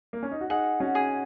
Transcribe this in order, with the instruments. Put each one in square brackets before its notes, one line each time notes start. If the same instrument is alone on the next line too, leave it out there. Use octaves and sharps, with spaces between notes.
[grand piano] A#3
C#4
D#4
F#4
[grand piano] D#4 G#4 [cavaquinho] F#5
[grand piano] C#4 F#4
[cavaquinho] G#4